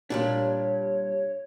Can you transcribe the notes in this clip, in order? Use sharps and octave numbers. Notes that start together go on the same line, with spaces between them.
A#2 G3 D4 C#5